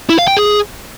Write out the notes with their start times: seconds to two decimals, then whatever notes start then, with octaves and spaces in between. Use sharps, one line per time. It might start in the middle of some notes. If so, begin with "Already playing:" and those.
0.09 E4
0.18 F5
0.28 G5
0.37 G#4